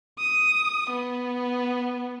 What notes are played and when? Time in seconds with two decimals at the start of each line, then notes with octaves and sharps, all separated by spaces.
0.19 D#6
0.90 B3